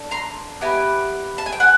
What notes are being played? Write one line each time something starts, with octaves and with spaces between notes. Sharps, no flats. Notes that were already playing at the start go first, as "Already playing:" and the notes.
Already playing: D4 A4
A#5 C6
B3 E4 G4 G#5 A#5
A5
G#5
G5
F#5 G#5